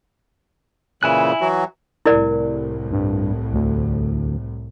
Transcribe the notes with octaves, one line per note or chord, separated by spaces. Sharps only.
A#2 C#3 E3 E4 G#5 F#6
E3 F#3 F#4
C2 A2 E4 A#4 D5
G2
D2